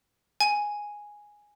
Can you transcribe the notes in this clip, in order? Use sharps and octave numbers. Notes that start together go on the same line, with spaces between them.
G#5